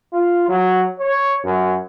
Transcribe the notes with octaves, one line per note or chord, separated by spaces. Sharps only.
F4
F#3
C#5
F#2